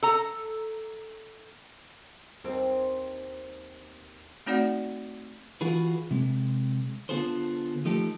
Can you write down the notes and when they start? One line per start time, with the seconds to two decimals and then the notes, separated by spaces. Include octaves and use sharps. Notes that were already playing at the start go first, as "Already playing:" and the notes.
0.03 A4 A#5
2.44 D#2 C4
4.46 A3 C4 D#4 F#4 D5 F#5
5.61 E3 F4 F#4 G#4 B4
6.11 C3 G#3
7.09 D3 B3 F4 G#4 A4 C5
7.85 F3 A3 D#4 G4 A4